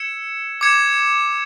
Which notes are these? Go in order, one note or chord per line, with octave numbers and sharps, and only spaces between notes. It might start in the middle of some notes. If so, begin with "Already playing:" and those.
Already playing: E6 G#6 C#7 E7
D6 G#6 C#7 E7